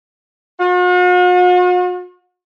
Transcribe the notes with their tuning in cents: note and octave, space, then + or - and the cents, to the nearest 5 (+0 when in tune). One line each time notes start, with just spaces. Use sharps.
F#4 -45